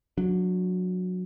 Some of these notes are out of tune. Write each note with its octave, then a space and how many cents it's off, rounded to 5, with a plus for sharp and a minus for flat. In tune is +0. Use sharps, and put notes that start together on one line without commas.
F#3 -20 D4 +0